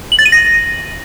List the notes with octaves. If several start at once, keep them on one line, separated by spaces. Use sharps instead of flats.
F#7
A6
D#7
A#6